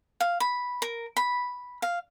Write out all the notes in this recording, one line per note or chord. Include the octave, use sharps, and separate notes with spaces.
F5
B5
A#4
B5
F5